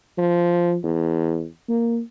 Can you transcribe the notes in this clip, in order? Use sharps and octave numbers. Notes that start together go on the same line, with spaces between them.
F3
E2
A#3